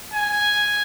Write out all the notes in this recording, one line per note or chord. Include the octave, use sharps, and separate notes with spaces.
G#5